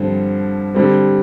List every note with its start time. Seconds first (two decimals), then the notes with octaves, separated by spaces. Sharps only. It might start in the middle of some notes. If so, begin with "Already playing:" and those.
Already playing: G2 D3 F3 C4
0.74 D3 G3 C4